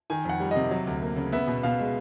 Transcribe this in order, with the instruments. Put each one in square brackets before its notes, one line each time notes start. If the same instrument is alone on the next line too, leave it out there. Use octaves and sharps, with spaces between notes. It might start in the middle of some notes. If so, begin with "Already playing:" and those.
[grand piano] D#3 G#5
F2 F#5
G3
C3 D#5
F#3
D2
A#3
C#3
B3 E5
B2
B2 F5
G#3